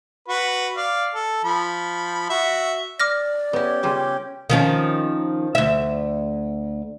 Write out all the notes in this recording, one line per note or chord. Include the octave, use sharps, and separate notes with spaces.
F#4 B4
D5 F5
A4
F3 B5
F#4 E5
D5 D6 F6 A#6
B3 C#4 E4 G4
C#3 G3 F4 G5
D#3 F3 C#4
D2 E5